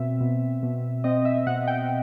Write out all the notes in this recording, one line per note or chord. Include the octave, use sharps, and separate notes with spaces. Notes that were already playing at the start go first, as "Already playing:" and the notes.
Already playing: B2 C4 E5
B2
B2
C4 D#5
E5
B2 F#5
G5